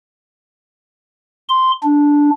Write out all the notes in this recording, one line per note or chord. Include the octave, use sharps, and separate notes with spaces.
C6
D4